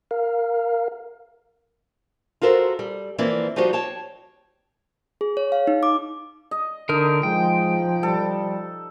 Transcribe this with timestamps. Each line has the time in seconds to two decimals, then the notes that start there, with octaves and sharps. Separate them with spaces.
0.11 A#4 F5
2.42 F4 F#4 A4 A#4 C5
2.79 G3
3.18 E3 F3 A#3 C4 E4 D5
3.56 F3 G3 D#4 F#4 G4 C5
3.73 C#5 G5 A5
5.21 G#4
5.37 C#5
5.52 F5
5.67 D#4
5.83 D6
6.51 D#5
6.89 D3 D#4 A#4
7.23 F3 G#3 G5
8.03 G3 A4